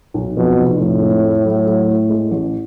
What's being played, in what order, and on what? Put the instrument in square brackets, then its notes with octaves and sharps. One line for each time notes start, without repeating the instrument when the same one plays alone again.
[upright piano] B1
[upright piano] F2 [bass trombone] B2
[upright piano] F1
[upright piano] F2 [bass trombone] A2
[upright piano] G#3
A3
F#3
F#3
A3
G#3
A1